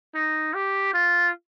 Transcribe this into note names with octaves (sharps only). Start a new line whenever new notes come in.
D#4
G4
F4